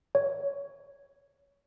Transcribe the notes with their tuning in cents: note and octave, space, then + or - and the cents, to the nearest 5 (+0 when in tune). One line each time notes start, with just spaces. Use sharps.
C#5 +20